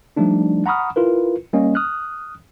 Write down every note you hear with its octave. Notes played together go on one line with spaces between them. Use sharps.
F3 G3 A3 D4 D#4
F#5 A#5 B5 C#6 D#6 F6
E4 F4 A#4 B4
G3 A#3 C#4 D#5
D#6 F6 F#6